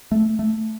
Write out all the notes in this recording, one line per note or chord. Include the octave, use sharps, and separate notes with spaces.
A3
A3